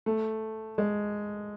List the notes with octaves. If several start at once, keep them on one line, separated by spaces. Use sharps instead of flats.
A3
G#3